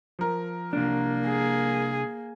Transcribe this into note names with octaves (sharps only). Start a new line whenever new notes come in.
F3 A#4
C2 A#3 D4
G#4